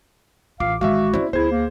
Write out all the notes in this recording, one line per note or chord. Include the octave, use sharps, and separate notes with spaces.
A1 F4 F5 D6
D#3 G#3 F#4 E5 F5
C4 C#4 E4 C5 D5
D2 B3 E4 G#4 C5 G#6
A#3